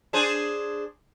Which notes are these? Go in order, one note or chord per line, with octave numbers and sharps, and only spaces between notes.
D4 G#4 C5